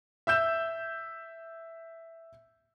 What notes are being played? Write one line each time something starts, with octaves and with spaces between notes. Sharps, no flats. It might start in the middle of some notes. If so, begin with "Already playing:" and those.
E5 E6 G6 E7